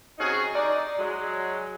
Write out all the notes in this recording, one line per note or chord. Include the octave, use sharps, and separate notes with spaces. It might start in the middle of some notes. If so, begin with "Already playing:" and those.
C3 F#3 C#4 D#4 F#4 G#4
D#4 D5 D#5
F#3 G#3